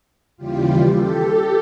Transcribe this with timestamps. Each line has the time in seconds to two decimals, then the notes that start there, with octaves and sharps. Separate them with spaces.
0.37 D#2 C#3 E3 G3 F4 G4
0.92 G4 A4